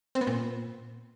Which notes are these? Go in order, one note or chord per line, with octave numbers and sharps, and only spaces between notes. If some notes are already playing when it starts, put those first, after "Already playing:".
C4
B3
A#2